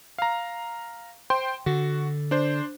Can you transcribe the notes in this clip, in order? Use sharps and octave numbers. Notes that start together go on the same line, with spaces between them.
F5 A#5
C5 G5 C6
D3 F#4
D4 C5